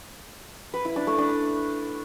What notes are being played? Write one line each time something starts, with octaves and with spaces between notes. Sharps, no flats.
B4
E4
D4
A3
D4